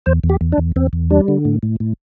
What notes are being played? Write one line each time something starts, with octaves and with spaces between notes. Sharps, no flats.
E2 C5
E2
G4
E2
D4
E2
E2 C4
E2
G3 D4
D3
A2
A2
A2